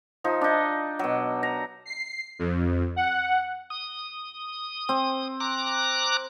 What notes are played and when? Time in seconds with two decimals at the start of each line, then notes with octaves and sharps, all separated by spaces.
0.24 F3 D#4
0.41 D4 D#4
0.99 B2 F#3
1.43 A#5
1.85 C7
2.39 F2
2.96 F#5
3.70 D#6
4.89 C4
5.40 A#5 D6 F#6